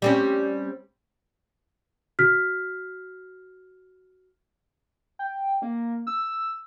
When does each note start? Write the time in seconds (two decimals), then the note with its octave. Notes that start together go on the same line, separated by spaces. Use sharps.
0.02 G3 C4 C#4
2.19 F#4 F6 B6
5.19 G5
5.62 A#3
6.07 E6